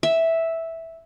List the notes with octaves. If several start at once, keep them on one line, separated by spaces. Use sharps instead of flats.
E5